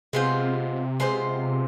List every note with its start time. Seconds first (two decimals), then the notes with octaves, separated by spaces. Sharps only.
0.13 C3 G#3 B3 F4 C5
1.00 G#3 B3 F4 C5